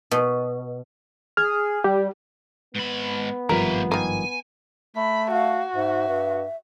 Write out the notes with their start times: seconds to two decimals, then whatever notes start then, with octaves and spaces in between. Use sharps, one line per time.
0.11 B2
1.37 G#4 F6
1.84 G3 G4
2.75 G#2 B3 B5
3.49 G#1 G2 F3 A#3 A#4 E5
3.92 D#3 A#3 G#5
4.96 A3 B5
5.32 F#4 F5
5.75 G#2 E5
6.07 G2